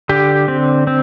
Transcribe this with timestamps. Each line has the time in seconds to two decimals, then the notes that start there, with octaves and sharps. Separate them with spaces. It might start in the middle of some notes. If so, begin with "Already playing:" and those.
0.09 D3 G4
0.48 C4
0.87 C4